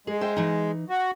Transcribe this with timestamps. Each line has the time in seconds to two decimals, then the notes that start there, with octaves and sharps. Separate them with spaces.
0.07 G#3 G#4
0.21 C5 E5 G5
0.36 E3 D#4
0.90 F#4